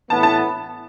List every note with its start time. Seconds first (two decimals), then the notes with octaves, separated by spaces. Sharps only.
0.10 A2 E3 B3 A5
0.23 A5